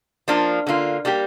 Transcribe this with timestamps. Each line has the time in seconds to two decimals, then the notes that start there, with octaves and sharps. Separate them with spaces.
0.28 F3 A#3 D4 F4
0.67 D3 A#3 F4
1.05 G3 A#3 G4